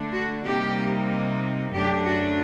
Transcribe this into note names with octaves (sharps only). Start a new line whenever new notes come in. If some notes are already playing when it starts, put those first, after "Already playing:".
Already playing: D3 A3 D4
F#4
C3 G3 A#3 D#4 G4
F#2 D3 A3 D4 G4
F#4